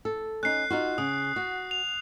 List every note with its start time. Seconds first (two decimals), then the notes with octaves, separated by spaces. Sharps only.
0.05 A4
0.43 C#4 D#4 F#6 C7
0.70 D#4 F4 F#4
0.98 C#3 D#6
1.36 F#4
1.71 F7